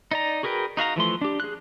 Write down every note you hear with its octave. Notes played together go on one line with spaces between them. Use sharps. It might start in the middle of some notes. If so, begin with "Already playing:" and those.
D#4 D5 A#5
F#4 G#4 A#4 B4 G5
D#4 F#4 F5 A#5
E3 F3 A3 C6
D4 G4
G#4 F#6